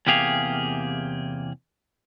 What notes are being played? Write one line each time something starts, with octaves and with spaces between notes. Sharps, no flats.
E2 C3 A#3 G4 G#4 F5